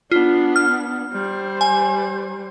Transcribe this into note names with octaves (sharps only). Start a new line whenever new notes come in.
B3 D4 F4
F6
G3 C5
G#5